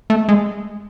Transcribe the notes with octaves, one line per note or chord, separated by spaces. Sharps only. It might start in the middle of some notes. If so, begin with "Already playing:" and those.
A3
G#3